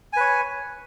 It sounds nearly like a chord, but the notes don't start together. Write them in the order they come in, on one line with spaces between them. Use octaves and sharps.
G#5 B4 C#5